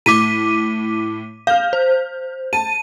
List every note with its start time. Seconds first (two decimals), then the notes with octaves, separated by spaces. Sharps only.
0.06 A2 D6 B6 D#7
1.47 F5 F6 G6
1.73 C5
2.53 A5 D#7